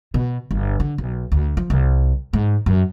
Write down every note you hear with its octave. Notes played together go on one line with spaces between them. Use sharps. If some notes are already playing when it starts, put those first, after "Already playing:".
B2
G1
D3
B1
D2
F3
C2
G#2
F#2